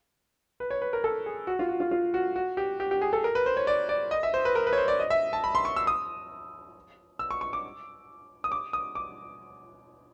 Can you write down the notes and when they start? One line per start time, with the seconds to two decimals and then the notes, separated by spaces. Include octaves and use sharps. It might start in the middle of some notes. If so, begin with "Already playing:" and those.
0.60 B4
0.71 C#5
0.82 B4
0.93 A#4
1.04 A4
1.26 G#4
1.47 F#4
1.59 F4
1.69 F#4
1.80 F4
1.91 F4
2.14 F#4
2.36 F#4
2.57 G4
2.80 G4
2.91 G4
3.02 G#4
3.13 A4
3.24 A#4
3.35 B4
3.46 C5
3.57 C#5
3.67 D5
3.89 D5
4.11 D#5
4.23 E5
4.34 C5
4.45 B4
4.55 A#4
4.67 B4
4.73 C#5
4.77 C5
4.88 D5
5.00 D#5
5.10 E5
5.33 A5
5.44 B5
5.55 C6
5.65 C#6
5.76 E6
5.87 D#6
7.19 E6
7.31 C#6
7.41 C#6
7.53 D6
8.44 D#6
8.52 D6
8.73 D#6
8.95 D6